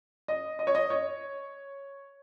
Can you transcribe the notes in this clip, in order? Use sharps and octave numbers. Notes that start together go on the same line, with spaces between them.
D#5
D#5
C#5
D#5
C#5